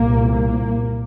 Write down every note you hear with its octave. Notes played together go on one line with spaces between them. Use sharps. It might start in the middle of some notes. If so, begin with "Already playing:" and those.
Already playing: C2 A#2 A#3
A#3